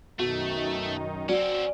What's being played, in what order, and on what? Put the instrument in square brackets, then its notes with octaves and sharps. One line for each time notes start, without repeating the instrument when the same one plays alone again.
[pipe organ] F#2 D#3 D#4 [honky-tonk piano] B2 [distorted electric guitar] A3
[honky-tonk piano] F#3 [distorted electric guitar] C4 C#4 [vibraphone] D5